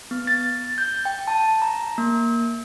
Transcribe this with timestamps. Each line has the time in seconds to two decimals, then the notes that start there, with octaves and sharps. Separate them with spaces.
0.11 B3
0.27 A6
0.78 G6
1.05 G5
1.28 A5
1.62 A#5
1.98 A#3